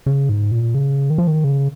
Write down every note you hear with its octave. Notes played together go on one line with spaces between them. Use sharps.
C#3
G#2
A#2
C#3
D#3
F3
D#3
C#3